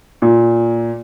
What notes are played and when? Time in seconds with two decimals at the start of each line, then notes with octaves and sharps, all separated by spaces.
0.22 A#2